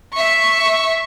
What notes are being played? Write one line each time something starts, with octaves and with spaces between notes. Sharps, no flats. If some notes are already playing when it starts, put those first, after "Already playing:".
E5 C#6